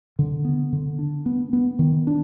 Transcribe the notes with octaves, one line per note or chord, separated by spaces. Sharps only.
D3
B3
D3
D4
B3
B3
D#3
D4